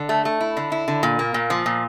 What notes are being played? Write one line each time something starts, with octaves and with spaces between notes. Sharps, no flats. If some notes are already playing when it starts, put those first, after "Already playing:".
Already playing: D3
A3
A3
E4
D3
E4
D3
A#2
A#3
A#2
F3
A#2